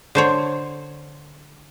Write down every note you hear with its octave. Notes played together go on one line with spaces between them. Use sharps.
D3 C5 C#5